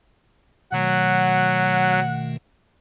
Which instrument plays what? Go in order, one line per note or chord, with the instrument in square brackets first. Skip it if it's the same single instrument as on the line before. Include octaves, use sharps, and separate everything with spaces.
[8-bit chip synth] B2 D#3 A3 [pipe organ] F#3 [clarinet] F#5